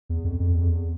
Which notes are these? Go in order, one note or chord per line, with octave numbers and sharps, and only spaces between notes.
E2
F2
F2
E2
F2
E2